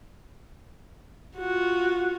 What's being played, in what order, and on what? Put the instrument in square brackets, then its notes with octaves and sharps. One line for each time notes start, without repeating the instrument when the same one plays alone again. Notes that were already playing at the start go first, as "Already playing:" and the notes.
[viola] F4 F#4